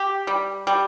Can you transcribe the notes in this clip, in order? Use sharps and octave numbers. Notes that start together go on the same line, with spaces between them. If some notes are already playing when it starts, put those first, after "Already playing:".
Already playing: G4
G3
G3